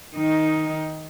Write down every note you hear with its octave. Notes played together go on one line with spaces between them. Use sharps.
D#3 D#4